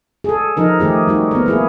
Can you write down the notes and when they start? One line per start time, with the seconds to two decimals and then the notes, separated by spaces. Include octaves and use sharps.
0.24 G#4 A4
0.57 F3 D#4 A#4
0.80 D#3 A3 G4 G#4
1.07 G3 D#4 F#4
1.31 B3 A#4
1.46 A#3 E4 G#4